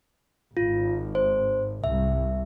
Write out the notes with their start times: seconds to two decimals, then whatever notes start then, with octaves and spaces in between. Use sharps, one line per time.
0.57 G#1 F4
1.15 C5
1.84 C2 E5